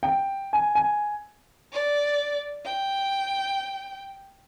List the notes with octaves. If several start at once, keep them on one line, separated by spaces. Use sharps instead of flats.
G5
G#5
G#5
D5
G5